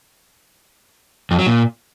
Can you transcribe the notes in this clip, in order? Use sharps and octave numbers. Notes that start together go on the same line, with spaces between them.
F2
F#3
A#2